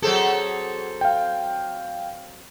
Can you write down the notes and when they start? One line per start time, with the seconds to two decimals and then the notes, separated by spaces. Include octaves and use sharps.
0.02 F#3 C4 G#4 A4
1.01 F5 G5